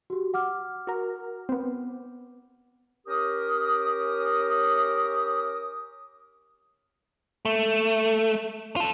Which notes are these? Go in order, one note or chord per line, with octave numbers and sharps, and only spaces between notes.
F#4 G4
F#5 D6 F6
F#4 A#4
B3 C4
C#4 G4 A#4 D#6
A3
F4 A4